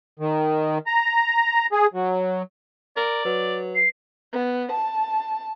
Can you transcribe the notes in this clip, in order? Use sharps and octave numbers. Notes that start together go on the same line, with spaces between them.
D#3
A#5
G#4
F#3
A#4 D5
F#3 B4
C7
B3
A5